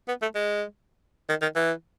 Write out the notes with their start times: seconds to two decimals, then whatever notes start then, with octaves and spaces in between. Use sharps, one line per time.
0.08 B3
0.22 A3
0.35 G#3
1.29 D#3
1.41 D#3
1.56 E3